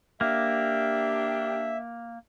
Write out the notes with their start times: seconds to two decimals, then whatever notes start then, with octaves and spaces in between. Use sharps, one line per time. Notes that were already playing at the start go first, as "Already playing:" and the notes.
0.21 A#3 D4 G4 E5